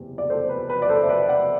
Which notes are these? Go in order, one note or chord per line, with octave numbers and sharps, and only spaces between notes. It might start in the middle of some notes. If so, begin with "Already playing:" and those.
Already playing: F#1 E2 C3
D5
A4 C5
B4
B4
D5
A4 C5
E5
B4 D5
D5 F#5